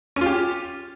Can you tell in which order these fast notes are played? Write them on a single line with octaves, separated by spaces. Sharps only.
C#4 F4 G4